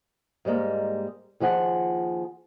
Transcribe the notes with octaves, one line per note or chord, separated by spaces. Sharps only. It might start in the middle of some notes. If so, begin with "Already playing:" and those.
G#2 G3 G#3 A#3
D#2 F3 G#4 F#5